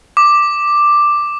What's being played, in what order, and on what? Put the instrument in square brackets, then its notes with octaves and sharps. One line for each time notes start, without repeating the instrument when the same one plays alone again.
[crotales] D6